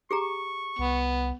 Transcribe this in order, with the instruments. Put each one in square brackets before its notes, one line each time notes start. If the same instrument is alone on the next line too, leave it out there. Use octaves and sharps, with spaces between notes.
[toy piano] G4 G#4 A#5 [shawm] C#6
[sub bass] C2 [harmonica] B3